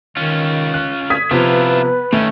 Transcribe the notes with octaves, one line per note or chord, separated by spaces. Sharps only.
D#3 C#4 F4
F#6
D#6 G#6 B6
C3 F3 B3 E4 F4 B4
D#3 A3 C#4